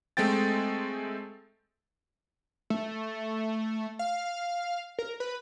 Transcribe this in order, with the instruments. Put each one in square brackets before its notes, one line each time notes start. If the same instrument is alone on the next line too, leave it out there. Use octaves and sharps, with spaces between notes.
[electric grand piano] G#3 A3 C4 G5 A6
[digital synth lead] A3
F5
A#4
B4